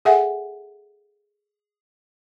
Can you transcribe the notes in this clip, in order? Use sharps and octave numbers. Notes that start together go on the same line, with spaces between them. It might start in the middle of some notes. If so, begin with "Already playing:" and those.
G#4 A4 E5 F#5 G#5